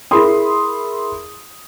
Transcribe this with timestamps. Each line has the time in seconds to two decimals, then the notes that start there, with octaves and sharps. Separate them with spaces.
0.11 E4 G#4 A#4 B5 C6 D#6